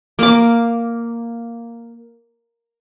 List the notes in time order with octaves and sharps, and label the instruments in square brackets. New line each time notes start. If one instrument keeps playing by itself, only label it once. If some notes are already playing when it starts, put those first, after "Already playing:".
[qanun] A#3 D6